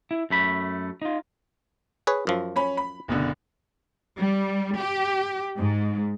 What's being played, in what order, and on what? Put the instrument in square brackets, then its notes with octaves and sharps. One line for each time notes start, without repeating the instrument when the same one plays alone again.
[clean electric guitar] E4
F#2 A3 B5
D#4 F4
[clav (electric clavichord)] G#4 B4 C#5
F#2 F3
[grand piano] C#4 B5
B5
F#1 B2 D3
[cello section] G3
G4
G#2